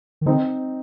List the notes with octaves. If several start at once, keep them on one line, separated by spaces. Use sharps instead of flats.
D#3
D3 C4 D#4